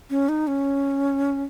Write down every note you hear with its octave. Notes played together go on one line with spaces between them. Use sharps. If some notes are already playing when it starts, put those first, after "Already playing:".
C#4
D#4
C#4